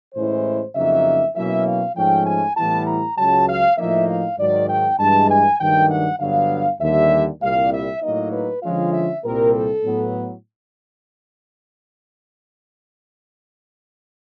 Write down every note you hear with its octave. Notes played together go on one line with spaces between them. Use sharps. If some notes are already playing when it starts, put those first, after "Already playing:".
A2 E3 G#3 C#4 E4 C5
F2 C#3 F#3 A#3 D#4 E5
B2 F#3 A#3 C#4 E4 E5
F5
G#2 F3 A3 C#4 G5
G#5
A2 E3 G3 B3 E4 A5
A#5
C#2 C#3 F#3 A5
F5
A2 F3 A#3 D#4 E5
F5
G#2 D#3 F#3 D5
G5
G2 E3 G#3 A5
G#5
G2 D#3 F#3 A3 D4 G5
F#5
G2 D3 F#3 B3 D4 F5
D#2 D3 G3 E5
C2 A#2 G3 F5
E5
A2 F#3 A#3 D#4 D#5
B4
D3 F3 G#3 C#4 F4 F5
E5
C2 A#2 G3 C4 A#4
A4
A2 F#3 B3